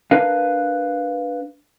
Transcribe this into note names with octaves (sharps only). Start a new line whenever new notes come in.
D4 A#4 B4 F5